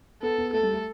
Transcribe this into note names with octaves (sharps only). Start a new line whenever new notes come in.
B3 A4
B3
A3 A4
G3
A3